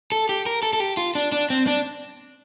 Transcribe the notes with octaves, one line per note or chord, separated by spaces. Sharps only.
A4
G4
A#4
A4
A4
G4
F4
D4
D4
C4
D4